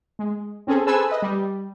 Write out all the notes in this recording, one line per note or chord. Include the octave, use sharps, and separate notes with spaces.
G#3
C4 C#4 G#4 A4
G#4 A4 B4 C5 G#5 E6
B4 D#5
G3